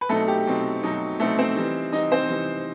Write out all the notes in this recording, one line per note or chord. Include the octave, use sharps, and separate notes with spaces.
B4
B2 F#3 A3 C4 D#4 A4
G4
B2 F#3 C4 D#4
B2 F#3 C4 D#4
B2 F#3 A3 C4 D#4 A4
C4 C5
E3 G3 D#4
E3 G3 D#4 D#5
C4 C5
E3 G3 D#4